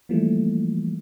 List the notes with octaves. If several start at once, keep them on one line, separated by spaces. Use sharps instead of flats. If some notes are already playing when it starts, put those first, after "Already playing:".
E3 F3 G3 A3 A#3